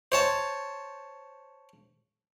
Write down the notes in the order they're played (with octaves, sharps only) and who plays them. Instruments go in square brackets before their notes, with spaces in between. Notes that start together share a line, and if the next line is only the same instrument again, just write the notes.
[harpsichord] C5 C#5 A5